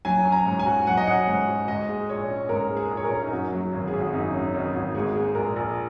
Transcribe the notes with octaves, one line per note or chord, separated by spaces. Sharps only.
F#3 G#5
C#4
A#5
G#2
G#5
F#4
F#3 F#5
D#5
C#4 F#5
G#2
F#4
G#2 D#5
G#3
A#1 C#5
C#4
G#2 A#4
G#3
G#4
A#1
C#5
A#4
C#4
D#4
F#2 F#4
F#3
G#1
G#4
G#1
F#4
F#2 D#4
F#3 C#4
G#1 D#4
G#1 F#4
G#2 G#4
G#3
A#1 A#4
A#1